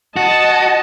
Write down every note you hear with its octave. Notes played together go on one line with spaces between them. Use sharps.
F#4 D#5 A5